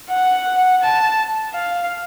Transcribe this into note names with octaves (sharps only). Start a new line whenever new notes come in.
F#5
A5
F5